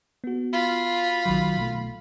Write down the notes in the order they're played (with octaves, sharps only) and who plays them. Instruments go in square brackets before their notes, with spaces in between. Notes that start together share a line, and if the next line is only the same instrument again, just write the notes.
[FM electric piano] B3 F#4
[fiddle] F4 B5
[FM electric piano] B1 D#3 F#3
B2 A3